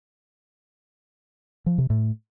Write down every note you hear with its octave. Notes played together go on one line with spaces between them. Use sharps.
F3
C3
A2